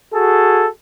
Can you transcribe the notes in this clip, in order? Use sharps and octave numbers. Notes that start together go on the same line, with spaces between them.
F#4 G#4 A4